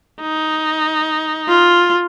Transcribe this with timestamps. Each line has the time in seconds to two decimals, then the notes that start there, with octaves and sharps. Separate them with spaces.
0.21 D#4
1.48 F4